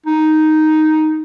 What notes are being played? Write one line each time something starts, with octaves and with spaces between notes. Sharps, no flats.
D#4